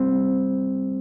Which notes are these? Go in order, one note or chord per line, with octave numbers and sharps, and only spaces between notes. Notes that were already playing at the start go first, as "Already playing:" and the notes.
Already playing: G3 C4